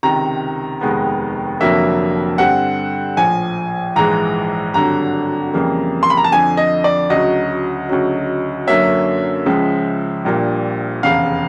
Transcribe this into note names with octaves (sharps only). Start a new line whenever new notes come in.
C#2 C3 D#3 A#5
F1 D#2 D#3 G#3 B3
F1 F2 D3 F#3 A#3 E5
G2 D3 G3 C4 F#5
A#1 A2 F3 G#5
A#1 G#2 E3 G#3 A#5
G#1 G2 D3 F#3 A#5
F2 C#3 E3 G3 A#3
C6
B5
A#5
A5
F2 D3 F3 G#5
D#5
D5
D2 C#3 F#3 D#5
D2 C#3 F#3
F#2 D3 F#3 A#3 C#4 E5
C#2 C#3 F3 G#3
A#1 A#2 G3 A#3 D4
F1 E2 C#3 F5